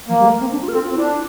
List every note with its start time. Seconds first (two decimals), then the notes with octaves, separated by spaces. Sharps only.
0.08 F3 A#3
0.19 G3
0.26 A3
0.30 A#3
0.41 C4
0.52 D4
0.62 F4
0.68 A#4
0.73 C4 A4
0.84 F4
0.90 C4
0.95 E4
0.98 D4